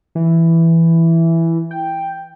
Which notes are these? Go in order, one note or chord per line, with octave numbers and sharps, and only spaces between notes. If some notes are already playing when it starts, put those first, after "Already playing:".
E3
G5